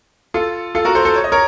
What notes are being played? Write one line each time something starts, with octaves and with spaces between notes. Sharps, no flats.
F4 A4
F4 A4
F#4 A#4
A4 C5
A4 C5
C#5
D#5
A#4 C#5